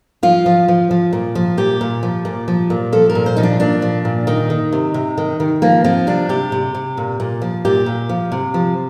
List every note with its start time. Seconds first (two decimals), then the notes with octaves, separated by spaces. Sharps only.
0.23 F3 F4
0.46 F3
0.68 F3
0.91 F3
1.13 A#2
1.35 F3
1.57 A#2 G4
1.81 A#2
2.03 F3
2.25 A#2
2.48 F3
2.70 A#2
2.92 F3 A4
3.10 A#4
3.15 A#2
3.26 C5
3.37 F3 D#4
3.43 D4
3.60 A#2 D4
3.82 F3
4.05 A#2
4.27 D#3 D#4
4.50 D#3
4.72 C3
4.94 C3
5.17 D#3
5.40 D#3
5.62 F3 A#3
5.84 F3 C4
6.07 C3 D4
6.29 C3 G4
6.52 C3
6.75 C3
6.97 A#2
7.20 A#2
7.42 F3
7.65 A#2 G4
7.86 A#2
8.09 F3
8.32 C3
8.54 F3